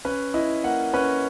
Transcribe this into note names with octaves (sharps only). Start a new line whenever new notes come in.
C#4 B4
E4 D#5
A#3 F#5
C#4 B4